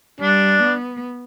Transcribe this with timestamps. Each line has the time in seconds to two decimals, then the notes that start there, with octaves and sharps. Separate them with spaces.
0.21 G3 D4
0.63 B3